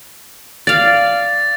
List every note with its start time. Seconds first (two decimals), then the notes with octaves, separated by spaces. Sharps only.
0.67 D5 F5 A6